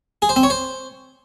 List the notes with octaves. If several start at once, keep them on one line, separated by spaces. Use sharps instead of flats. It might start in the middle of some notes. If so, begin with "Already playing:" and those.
G#4
C5
C4
C#5
C5